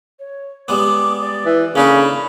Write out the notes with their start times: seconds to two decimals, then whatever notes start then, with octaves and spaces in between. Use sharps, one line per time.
0.19 C#5
0.68 G3 G#3 B3 D6
1.21 D5
1.46 E3
1.75 C#3 A#3 D4 A4 B5